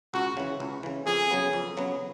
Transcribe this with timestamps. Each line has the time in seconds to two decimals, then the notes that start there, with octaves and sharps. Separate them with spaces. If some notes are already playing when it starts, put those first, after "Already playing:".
0.14 C#2 F#4
0.37 C#3 E3
0.60 C#2
0.83 C#3 E3
1.06 F2 G#4
1.31 C#3 F#3 B3
1.53 F2
1.77 C#3 F#3 B3